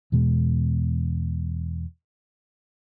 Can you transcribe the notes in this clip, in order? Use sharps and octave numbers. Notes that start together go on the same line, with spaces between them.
E2 B2 G#3